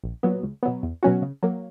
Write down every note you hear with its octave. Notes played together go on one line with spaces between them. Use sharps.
A#1
A#2 F#3 B3
C#2
B2 F#3 B3
E2
B2 F#3 C#4 F#4
C#3
F#3 A#3